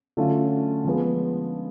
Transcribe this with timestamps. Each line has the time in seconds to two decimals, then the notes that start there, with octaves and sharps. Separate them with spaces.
0.17 D3 F#3 A3 C#4 F4
0.85 F3 G#3 B3